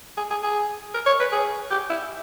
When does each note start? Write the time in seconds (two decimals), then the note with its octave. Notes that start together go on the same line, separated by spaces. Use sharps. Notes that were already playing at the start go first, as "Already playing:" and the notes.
0.17 G#4
0.31 G#4
0.43 G#4
0.94 A#4
1.06 C#5
1.20 B4
1.32 G#4
1.71 G4
1.90 E4